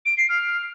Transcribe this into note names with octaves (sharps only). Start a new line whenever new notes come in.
D7
C7
F6